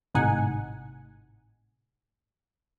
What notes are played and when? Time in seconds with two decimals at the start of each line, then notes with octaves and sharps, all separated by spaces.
0.14 G#1 A2 C3 D#4 F#5 G#5